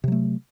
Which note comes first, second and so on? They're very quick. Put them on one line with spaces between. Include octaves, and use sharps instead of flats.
C3 F#3 A3